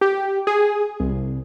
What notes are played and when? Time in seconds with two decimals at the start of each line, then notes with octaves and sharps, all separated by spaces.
0.01 G4
0.47 G#4
1.00 C2